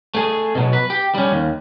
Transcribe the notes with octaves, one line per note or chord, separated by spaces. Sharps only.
A3 G#4
B2 F#3
B4
G4
G3 C#4
D#2